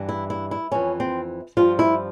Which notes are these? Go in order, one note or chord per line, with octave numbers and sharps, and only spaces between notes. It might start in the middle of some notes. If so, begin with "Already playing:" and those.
Already playing: G2 E3
E4
E4
E4
F2 E3 C#4
C4
G2 F3 F4
E4